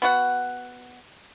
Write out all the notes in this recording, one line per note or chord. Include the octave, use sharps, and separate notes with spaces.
B3 F#4 F#5